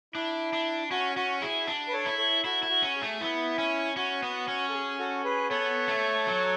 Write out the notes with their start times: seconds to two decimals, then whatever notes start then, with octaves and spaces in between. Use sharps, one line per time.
0.14 D4 E4
0.53 D4
0.91 C#4 F#4
1.16 C#4 F#4
1.42 E4 G#4
1.68 D4
1.88 B4
1.93 A4 C#5
2.06 E4
2.18 A4 C#5
2.44 E4 F#4 A4
2.63 E4
2.70 F#4
2.83 C#4
2.95 G#4
3.02 A3
3.21 B3 E4
3.58 C#4
3.97 C#4 F#4
4.23 B3
4.48 C#4
4.69 A4
4.74 G#4
4.99 F#4 A4
5.24 G#4 B4
5.50 B3 A4 C#5
5.88 A3
6.27 F#3